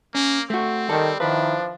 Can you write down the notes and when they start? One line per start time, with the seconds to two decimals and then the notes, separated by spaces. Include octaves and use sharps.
0.15 A#3 C#4
0.50 A3 C4 F#4
0.89 D#3 G3 A4
1.20 D#3 F3 D4 E4 B4